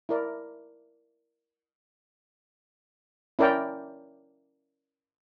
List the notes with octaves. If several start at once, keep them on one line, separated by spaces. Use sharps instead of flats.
E4 A#4 D5
C#4 E4 A#4 D5 G5